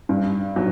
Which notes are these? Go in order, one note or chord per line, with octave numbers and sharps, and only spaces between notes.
G2
F#3